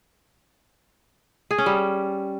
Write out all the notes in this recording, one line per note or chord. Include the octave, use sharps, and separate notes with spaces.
G#4
C#4
G3